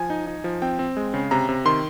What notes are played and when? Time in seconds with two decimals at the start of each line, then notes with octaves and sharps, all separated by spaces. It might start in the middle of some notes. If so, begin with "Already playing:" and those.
Already playing: F3 G#5
0.10 D#4
0.27 D#4
0.44 F3
0.62 C4 G5
0.79 C4
0.97 G#3
1.14 C#3
1.31 C3 A#5
1.49 C3
1.65 D#3 C6